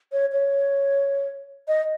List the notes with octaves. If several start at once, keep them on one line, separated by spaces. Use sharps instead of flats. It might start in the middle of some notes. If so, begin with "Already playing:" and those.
C#5
C#5
D#5